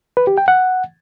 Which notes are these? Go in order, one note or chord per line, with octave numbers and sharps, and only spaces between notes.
B4
G4
G5
F#5